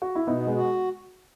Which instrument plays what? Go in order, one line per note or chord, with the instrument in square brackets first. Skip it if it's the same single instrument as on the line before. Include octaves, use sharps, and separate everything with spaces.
[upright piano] F#4
E4
[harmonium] B2 [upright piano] B3 D#4
[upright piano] G#3 B3
[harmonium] F#4